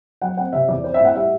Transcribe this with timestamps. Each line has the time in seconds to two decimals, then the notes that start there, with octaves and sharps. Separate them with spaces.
0.21 F#3 F#5
0.37 C4 F#5
0.53 C3 E5
0.68 E2 D5
0.84 C4 C5
0.94 E5
1.00 A2
1.05 F#5
1.15 G3 E5